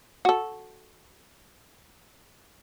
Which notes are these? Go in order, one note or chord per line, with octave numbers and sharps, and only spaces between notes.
F#4 A4